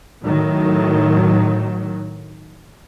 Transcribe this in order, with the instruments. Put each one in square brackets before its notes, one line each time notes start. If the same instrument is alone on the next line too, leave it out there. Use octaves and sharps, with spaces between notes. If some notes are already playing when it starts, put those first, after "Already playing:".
[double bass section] A2 D#3 F#3